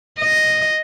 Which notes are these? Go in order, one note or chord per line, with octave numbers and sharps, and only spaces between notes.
D#5